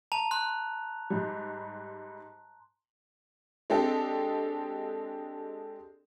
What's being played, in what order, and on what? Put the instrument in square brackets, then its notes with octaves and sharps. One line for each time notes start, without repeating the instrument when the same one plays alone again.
[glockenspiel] A5 A#5 F7
C6 F#6
[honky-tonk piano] G#2 G3
G#3 C4 D4 G4 A4